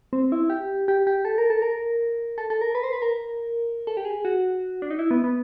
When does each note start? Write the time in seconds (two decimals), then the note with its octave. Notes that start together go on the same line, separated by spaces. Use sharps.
0.13 C4
0.32 E4
0.50 G4
0.88 G4
1.07 G4
1.25 A4
1.38 A#4
1.50 A4
1.62 A#4
2.38 A4
2.50 A4
2.61 A#4
2.75 B4
2.84 C5
2.93 B4
3.02 A#4
3.87 A4
3.97 G4
4.05 G#4
4.25 F#4
4.82 D4
4.90 D#4
4.99 E4
5.11 B3
5.24 B3